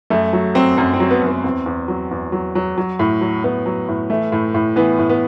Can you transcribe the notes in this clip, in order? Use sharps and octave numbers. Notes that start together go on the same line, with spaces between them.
F#2 A3
F#3
F#3 C4
F#2 C4
C4
F#3
B3
F#2
B3
E2 C4
E2
F#3
E2
F#3
F#3
F#3
A2
F#3
A2 B3
F#3
A2
E3 A3
A2
A2
E3 B3
A2
B3